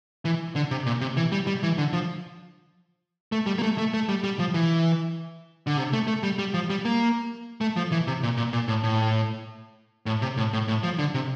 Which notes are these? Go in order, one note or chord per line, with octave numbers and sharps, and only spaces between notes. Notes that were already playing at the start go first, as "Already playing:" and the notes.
E3
D3
C3
A#2
C3
E3
G3
G3
E3
D3
F3
A3
G3
A#3
A3
A3
A3
G3
G3
F3
E3
D3
C3
A3
A3
G3
G3
F3
G3
A#3
A3
F3
E3
C3
A#2
A#2
A#2
A2
A2
A2
C3
A2
A2
A2
F3
D3
C3